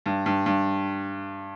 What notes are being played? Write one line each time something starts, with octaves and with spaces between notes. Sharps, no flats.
G2
G2
G2